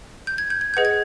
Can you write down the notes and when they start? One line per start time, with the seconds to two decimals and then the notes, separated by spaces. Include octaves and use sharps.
0.27 G6
0.38 G#6
0.50 G6
0.61 G#6
0.74 G#4 B4 D#5 F#5 G6
0.85 G#6